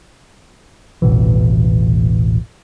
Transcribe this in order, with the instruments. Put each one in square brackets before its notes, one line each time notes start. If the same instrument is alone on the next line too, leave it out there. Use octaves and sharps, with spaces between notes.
[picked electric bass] D#1 A1 B2 E3